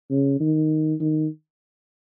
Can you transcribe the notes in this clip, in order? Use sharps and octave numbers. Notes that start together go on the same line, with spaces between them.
C#3
D#3
D#3